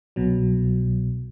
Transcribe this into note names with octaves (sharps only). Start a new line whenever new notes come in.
C2 B2 F#3